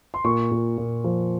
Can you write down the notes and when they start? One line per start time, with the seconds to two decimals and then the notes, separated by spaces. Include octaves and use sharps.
0.14 C6
0.24 A#2 C#6
0.51 A#2
0.78 A#2
1.04 F3